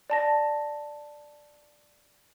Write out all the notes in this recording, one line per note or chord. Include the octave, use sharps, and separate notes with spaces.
D5 A5 A#6